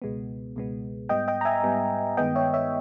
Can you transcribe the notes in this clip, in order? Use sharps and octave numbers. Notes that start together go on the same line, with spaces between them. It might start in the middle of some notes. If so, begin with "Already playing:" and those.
C#2 B2 G#3 B3
C#2 B2 G#3 B3
G#2 G3 B3 D#5 G5
D#5 G5
A#5
E5 G#5
G#2 G3 B3
G2 D#3 G#3 B3 D#5 G5
C#5 E5
C#5 E5